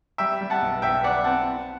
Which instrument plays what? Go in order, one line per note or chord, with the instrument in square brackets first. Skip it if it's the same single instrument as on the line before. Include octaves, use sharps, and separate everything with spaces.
[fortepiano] G3 E5 G5
G3
F#5 A5
B1
B1 E5 G5
B1 D5 F#5
C4 F#5 A5
B3